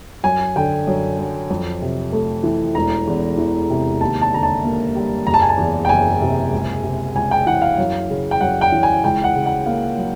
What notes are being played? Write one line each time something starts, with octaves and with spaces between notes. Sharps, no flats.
F#2 G#5
D3 G5
F#2
F#3
F2
C3
A3
E3
E1 A#5
E2
E3
C3
D#2 A5
A5
D3 A#5
A5
A#3
G3
F#1 A#5
A5
G#5
A5
E2
G5
F#1 G#5
C3
C#2
C3
C#2 G#5
G5
E3 F#5
F5
F#2
C#3
G5
F#2 F#5
G5
E3
G#5
C#2 G5
F#5
C#3
F#5
A#3 F5
F#3